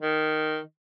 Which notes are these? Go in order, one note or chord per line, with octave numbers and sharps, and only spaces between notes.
D#3